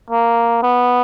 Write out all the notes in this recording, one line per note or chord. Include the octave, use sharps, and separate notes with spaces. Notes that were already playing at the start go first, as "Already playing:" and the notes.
A#3
B3